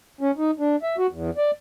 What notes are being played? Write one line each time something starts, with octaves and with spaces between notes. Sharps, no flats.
C#4
D#4
D4
E5
F#4
E2
D5